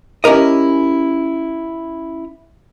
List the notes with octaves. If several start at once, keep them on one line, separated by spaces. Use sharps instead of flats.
C#4 E4 G4 A#4 D#5